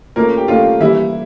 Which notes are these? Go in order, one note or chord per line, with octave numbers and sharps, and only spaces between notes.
A#2 A3 A#3 C#4 A#4
G4 G5
A#2 A3 C#4 F4 F5
E3 G3 A#3 E4 E5